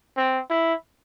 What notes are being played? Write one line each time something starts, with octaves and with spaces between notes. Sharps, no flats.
C4
E4